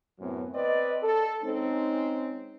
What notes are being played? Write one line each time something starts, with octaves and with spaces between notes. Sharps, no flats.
F#2 A2 C3 F#3 B3 C4
C4 B4 D5 D#5
A4
G#3 C4 C#4 D#4